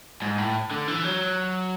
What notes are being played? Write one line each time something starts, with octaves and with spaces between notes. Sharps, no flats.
G#2
A2
D3
E3
F#3